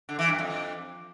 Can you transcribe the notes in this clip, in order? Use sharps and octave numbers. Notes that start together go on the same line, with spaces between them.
D3
E3
G2
F2